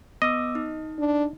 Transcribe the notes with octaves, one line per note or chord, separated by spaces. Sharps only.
B3 D#5 D6 E6
D#4
D4